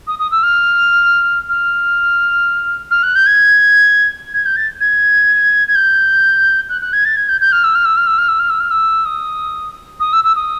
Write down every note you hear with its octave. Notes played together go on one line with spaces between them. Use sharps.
D#6
D#6
E6
F6
F6
F6
F#6
G6
G#6
G#6
G6
A6
G#6
G#6
G6
F#6
F#6
G#6
A6
G#6
G6
G6
F6
E6
F6
E6
F6
E6
F6
E6
F6
E6
F6
E6
D#6
D#6
E6
E6
D#6